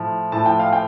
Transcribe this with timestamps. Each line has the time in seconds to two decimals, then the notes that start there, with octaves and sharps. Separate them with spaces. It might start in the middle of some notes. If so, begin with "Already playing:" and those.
Already playing: A2 F3
0.32 A2 F3 A5
0.46 G5
0.59 F5
0.73 G5